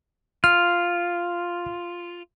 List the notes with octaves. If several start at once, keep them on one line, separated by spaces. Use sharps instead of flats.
F4 F6